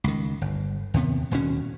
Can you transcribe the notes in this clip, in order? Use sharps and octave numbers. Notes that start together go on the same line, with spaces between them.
C#2 D#3
G1
D#2 C3 B3
D#1 D#2 B2 C#4